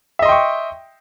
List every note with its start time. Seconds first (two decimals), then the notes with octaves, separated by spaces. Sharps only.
0.19 E5
0.22 D#5
0.26 C6
0.29 G5
0.32 C#6